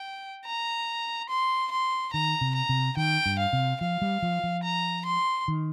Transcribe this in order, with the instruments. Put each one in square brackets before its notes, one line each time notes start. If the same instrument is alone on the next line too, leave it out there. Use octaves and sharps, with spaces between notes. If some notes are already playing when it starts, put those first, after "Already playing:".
Already playing: [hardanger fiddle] G5
A#5
C6
C6
[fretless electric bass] D#3 [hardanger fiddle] A#5
[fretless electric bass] C3
[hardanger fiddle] A#5
[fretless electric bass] C3
[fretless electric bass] D#3 [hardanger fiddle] G5
[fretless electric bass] G2
[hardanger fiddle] F5
[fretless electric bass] C3
[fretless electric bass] F3 [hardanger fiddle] F5
[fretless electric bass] G3
F3
F3
[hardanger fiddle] A#5
C6
[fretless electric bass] D#3